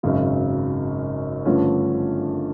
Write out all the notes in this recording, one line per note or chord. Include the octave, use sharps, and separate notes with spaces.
G#1 F#2 C#3 F#3
G2 D3 F3 A3 C#4